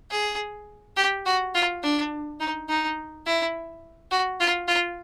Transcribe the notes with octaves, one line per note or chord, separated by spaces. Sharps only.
G#4
G4
F#4
F4
D4
D#4
D#4
E4
F#4
F4
F4